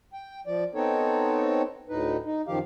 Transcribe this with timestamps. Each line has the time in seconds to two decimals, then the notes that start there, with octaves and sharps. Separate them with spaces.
0.13 G5
0.47 F3 D5
0.75 B3 C4 D#4 A4 C#5
1.89 D2 A2 D#4 B4
2.26 D#4
2.48 F#2 D#3 F3 G4 F5